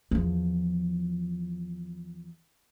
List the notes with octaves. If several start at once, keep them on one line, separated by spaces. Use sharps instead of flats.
E2 F3